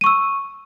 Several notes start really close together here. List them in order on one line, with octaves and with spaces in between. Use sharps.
D#7 C#6 E6